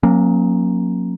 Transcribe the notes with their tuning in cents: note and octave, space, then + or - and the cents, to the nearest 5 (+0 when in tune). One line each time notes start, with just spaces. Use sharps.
F#3 -35 A#3 +0 C#4 -30